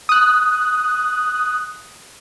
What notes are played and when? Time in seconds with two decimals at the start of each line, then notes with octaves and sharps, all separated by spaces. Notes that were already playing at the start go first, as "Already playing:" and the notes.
0.09 D#6 F#6